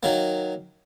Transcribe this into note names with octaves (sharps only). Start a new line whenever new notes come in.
D#3 F#3 A#3